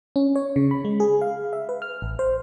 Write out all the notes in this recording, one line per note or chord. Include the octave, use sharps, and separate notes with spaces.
C#4
C#5
C#3
B5
G#3
G#4
F5
E5
B4
F6
A1
C5